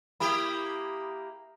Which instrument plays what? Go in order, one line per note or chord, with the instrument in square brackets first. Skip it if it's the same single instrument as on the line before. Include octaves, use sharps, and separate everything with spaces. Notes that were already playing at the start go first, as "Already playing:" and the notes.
[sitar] A#3 E4 G4 [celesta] B5 D#6